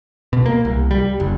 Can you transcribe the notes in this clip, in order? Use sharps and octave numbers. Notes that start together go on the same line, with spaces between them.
B2
A#3
C2
G3
F#1